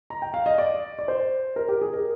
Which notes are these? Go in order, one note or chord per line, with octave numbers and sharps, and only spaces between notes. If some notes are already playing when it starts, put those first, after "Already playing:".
A#5
G5
F5
D#5
D5
D5
C5
A#4
G4
G#4
A#4